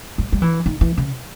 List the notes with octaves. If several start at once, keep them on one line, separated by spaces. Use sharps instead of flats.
G3
G3
E3
D#3
E3
C#3